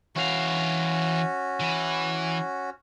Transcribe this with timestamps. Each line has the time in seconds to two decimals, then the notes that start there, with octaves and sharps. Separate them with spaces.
0.16 E3 C#4 F#4 F5
1.61 E3